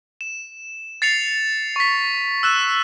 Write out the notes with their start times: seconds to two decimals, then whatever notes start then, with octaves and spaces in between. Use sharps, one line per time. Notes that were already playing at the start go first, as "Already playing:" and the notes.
0.21 E7
1.02 A6 C7 C#7 F7
1.76 C#6 B6
2.43 E6 F#6 E7